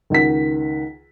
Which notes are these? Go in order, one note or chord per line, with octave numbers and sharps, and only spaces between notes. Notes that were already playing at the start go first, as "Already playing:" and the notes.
C#2 D#3 F#5 B6